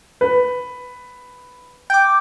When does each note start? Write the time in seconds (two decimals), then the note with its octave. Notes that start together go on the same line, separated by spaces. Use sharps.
0.21 B4
1.90 G5 D6